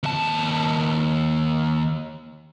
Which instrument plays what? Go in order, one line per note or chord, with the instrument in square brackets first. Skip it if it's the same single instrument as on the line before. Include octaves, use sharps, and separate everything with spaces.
[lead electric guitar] D#2 A5